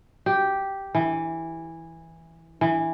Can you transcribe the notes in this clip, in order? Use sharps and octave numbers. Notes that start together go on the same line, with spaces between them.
G4
E3
E3